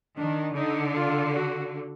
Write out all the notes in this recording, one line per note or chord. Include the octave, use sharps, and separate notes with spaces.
D#3 D4
D3 D#4
F4
F#4